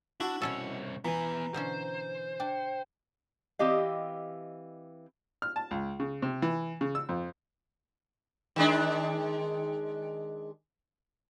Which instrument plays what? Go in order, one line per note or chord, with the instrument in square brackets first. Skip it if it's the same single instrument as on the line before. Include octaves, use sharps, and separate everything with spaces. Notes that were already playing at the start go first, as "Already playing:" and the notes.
[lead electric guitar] D4 [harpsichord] E4 F#4
[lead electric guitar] C2 C#5 [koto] B2 C#4 A4
[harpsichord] E3 [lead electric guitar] B3 G#5 [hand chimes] A#5
[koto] B2 D3 C#4 [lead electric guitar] C5
[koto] D4 [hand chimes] G5
[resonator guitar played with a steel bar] E3 C4 G4 D#5 F5
[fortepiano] F6
A5
C#2
C#3
C3
E3
C#3
E6
F2
[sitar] D#3 G#3 D4